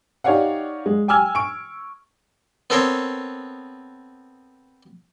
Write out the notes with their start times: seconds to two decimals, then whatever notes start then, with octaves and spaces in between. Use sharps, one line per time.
0.24 D#4 G4 C#5 D5 F5 F#5
0.86 G#3
1.08 G5 G#5 D6 E6 F6 G#6
1.35 C#6 D7
2.70 B3 C4 A4 A#4 C5 C#5